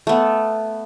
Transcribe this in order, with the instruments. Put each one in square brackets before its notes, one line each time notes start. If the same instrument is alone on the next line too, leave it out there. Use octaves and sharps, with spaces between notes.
[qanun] A3 B3